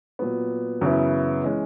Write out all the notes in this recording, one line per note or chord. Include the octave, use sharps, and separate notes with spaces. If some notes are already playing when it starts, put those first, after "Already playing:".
A#2 F#3 B3
F#2 C#3 E3 B3 E4
E3 G#3 C#4